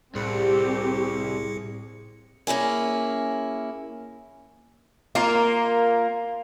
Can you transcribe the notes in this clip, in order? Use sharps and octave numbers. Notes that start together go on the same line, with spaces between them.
C2 A2 C4 G4 G#4 C#7
A#3 C#4 E4 G#4
A#3 F4